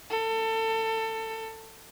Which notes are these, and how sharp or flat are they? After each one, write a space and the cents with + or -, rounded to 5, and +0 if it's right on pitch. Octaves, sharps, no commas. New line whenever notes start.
A4 +25